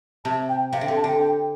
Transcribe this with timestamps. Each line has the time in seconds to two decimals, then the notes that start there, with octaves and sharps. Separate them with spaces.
0.25 C3 A5
0.49 G5
0.73 C3 F5
0.81 D3 G5
0.88 C3
0.96 A5
1.04 D3 G5
1.19 G5